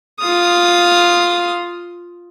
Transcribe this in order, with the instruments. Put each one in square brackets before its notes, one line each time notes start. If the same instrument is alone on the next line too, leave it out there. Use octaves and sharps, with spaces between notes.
[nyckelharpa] F4 D#6